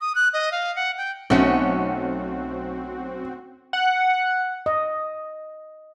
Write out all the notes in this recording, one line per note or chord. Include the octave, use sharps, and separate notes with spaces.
D#6
F#6
D#5
F5
F#5
G5
B1 A3 C4 C#4 F#4 F#5 C#7
F#5
D#5